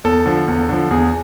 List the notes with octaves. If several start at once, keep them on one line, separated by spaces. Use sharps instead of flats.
E2 A4
D3 F3
E2
D3 F3
E2 G#4